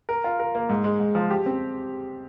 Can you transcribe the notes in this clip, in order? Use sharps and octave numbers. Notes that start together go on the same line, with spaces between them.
A#4
F4
A#4
A#3
G#2
G#3
G#2
F3
G4
C4